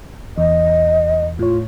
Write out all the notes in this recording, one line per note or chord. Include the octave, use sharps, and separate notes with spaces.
E2 D#5
A2 F4 C#5